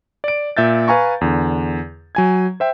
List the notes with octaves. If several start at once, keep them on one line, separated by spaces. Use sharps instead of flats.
D5 D7
A#2 E5 G6 A6
B4 F5 G#5 A#5 C#6
E2 D3
F#3 G#5 G#6
C5 E5 G5